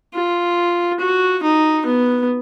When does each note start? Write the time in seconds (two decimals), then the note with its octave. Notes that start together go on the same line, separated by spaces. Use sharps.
0.14 F4
1.00 F#4
1.43 D#4
1.86 B3